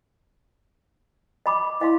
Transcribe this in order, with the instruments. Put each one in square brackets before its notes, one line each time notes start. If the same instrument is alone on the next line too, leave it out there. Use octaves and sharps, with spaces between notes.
[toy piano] D#5 B5 D6
[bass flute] E4 [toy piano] D#5 F5 C6